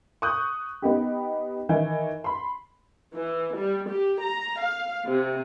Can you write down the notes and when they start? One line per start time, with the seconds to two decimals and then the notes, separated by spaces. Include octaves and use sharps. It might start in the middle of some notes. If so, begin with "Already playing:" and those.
0.22 C#6 D#6 F#6 G6
0.82 B3 D#4 G4
1.69 D#3 E3 D#4
2.24 B5 C6
3.15 E3
3.58 G3
3.90 G4
4.22 A#5
4.61 F5
5.06 C3